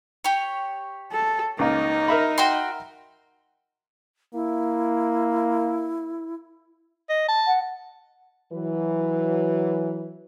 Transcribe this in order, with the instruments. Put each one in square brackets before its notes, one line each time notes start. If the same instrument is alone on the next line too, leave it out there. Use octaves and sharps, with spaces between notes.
[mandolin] G4 C#5
[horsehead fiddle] A4
[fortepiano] C#2 A#3 [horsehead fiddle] D#4
[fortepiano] A#4 E5 B5
[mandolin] F#4 G5 C6
[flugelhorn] A#3 [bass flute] E4
[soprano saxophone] D#5
A5
[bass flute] F#5
[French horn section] E3 F#3 B4